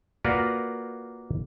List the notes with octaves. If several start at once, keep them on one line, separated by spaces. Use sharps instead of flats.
A#3 F4 F#4 A#4 B4 D5